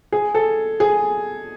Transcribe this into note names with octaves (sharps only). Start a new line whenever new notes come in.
G#4
A4
G#4